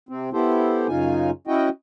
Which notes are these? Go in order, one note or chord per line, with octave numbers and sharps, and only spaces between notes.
C3 C4
B3 E4 G4 A4 C5
F#2 C#3 D#4 F4 G#5
C#4 E4 F#4 D#5 G5